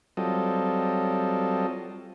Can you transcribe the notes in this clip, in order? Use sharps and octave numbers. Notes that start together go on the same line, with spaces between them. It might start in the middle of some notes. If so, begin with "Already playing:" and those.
F#3 G3 C4 F4 A4 D#5